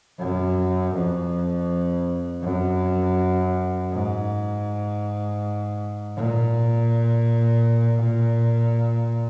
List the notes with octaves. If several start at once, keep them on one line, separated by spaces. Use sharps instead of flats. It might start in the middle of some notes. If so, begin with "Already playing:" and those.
F#2
F2
F#2
G#2
A#2